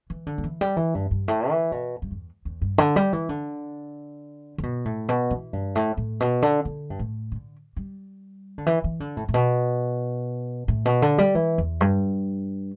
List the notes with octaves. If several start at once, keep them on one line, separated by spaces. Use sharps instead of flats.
E3
D3
G3
E3
G3
E3
G2
G2
A2
E3
B2
G2
E2
E2
G2
D3
G3
E3
D3
D3
B2
A2
B2
E3
G2
A2
A2
B2
D3
D3
G2
A2
D3
G3
D3
E3
E3
D3
A2
A2
B2
A2
B2
D3
G3
E3
E2
G2